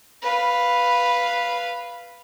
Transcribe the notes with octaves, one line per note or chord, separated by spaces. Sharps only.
B4 F5